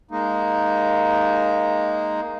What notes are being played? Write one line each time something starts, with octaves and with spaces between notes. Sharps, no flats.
G#3 A#3 D#4